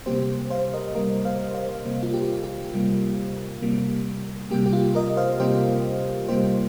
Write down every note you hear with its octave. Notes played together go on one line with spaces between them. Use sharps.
C3 G3 A#3 G4 C5
C5 F5
A#4 D#5
C3 G3 A#3 A#4 D#5
C5 F5
C5 F5
C3 G3 A#3
F4
G4
G4
C3 G3 A#3
C3 G3 A#3
C3 G3 A#3 G4
G4
F4
A#4 D#5
C5 F5
C3 G3 A#3 G4 C5
C3 G3 A#3 G4 C5